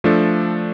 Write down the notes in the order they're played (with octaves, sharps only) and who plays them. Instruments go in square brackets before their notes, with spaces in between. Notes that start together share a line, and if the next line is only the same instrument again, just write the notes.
[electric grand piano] F3 A3 D4 A4